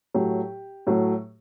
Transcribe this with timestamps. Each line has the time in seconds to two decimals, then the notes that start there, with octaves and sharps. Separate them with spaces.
0.14 A2 F#3 A3 G4
0.87 A2 F#3 A3